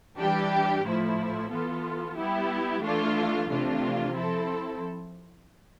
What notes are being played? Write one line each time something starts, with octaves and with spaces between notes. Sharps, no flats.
E3 G3 D4 G4
A2 F3 A3 E4
E3 B3 F4 A4
G3 B3 E4 G4
E3 A3 D4 F4
C3 E3 A3 D4 F4
F3 C4 E4 A4